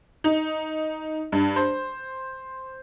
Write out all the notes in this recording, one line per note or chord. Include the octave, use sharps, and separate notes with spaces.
D#4
G2
C5